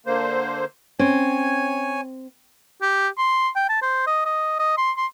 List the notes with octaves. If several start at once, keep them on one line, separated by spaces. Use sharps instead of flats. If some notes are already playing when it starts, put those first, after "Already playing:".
D3 A#3 C5
C4 C#4 C#5 G#5
G4
C6
G5
A5
C5
D#5
D#5
D#5
C6
C6